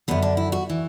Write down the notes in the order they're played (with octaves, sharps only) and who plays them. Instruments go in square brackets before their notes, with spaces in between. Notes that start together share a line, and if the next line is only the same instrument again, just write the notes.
[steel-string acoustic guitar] F#2 D3 B3
D4
E4
F#4
E3